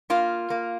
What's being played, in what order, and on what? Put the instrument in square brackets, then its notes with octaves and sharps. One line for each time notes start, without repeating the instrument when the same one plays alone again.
[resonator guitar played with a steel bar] A#3 F4
A#3